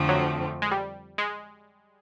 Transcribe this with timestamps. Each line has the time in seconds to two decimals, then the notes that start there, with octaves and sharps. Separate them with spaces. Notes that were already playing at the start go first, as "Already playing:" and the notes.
Already playing: F2 D3 F3 A3 C4
0.09 F#3
0.62 G#3
0.71 G3
1.18 G#3